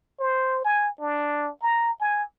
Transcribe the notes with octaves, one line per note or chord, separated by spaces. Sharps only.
C5
G#5
D4
A#5
G#5